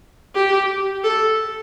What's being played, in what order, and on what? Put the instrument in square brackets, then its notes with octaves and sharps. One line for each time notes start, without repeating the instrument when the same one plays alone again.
[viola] G4
A4